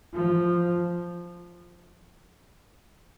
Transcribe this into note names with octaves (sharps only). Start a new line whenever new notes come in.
F3